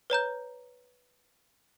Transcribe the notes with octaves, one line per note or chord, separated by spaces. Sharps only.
B4 C#5 A#5 G6